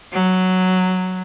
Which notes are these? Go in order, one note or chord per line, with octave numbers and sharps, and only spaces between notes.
F#3